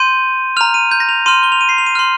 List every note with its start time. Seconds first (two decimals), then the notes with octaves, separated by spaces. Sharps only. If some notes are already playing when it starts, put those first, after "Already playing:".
Already playing: C6 G6 D#7
0.57 A#5 F6 F7
0.74 D#7
0.91 G6
1.00 A#6
1.09 F7
1.26 C6 F6 D#7
1.43 G7
1.52 F7
1.61 D#7
1.69 C7
1.78 F7
1.86 D#7
1.95 C6 F6